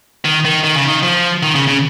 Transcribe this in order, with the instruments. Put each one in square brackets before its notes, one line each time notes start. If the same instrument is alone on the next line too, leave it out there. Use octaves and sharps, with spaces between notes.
[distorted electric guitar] D#3
D#3
D#3
C#3
D#3
F3
D#3
C#3
C#3